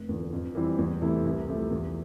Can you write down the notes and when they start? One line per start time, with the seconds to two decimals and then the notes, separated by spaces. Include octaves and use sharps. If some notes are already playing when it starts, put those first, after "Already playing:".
Already playing: F1
0.09 E2 D3 F3
0.32 F2
0.55 E3 G3 C4 E4
0.78 E2
1.02 C3 E3 A3 E4
1.25 C2
1.48 C3 F3 A3
1.71 E2